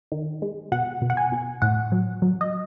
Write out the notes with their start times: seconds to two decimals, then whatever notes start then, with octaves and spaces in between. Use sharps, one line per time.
0.12 D#3
0.42 G#3
0.72 B2 F#5
1.02 B2
1.10 F#5
1.17 G#5
1.32 B2
1.62 A2 F#5
1.92 F#3
2.22 F#3
2.41 D#5